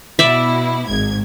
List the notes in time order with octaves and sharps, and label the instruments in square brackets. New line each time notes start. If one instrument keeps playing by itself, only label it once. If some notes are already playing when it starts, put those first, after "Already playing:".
[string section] B2 E4 [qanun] D5 E5
[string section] G#1 G#2 G#6